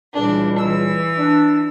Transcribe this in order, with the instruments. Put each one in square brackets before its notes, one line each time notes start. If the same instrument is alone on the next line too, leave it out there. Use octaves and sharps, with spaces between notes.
[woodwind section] C#2 A#2 G3 [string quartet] E3 D4
[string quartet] E3 E6
[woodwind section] D4